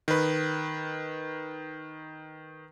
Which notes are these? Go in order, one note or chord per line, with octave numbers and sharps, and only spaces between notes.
D#3 B4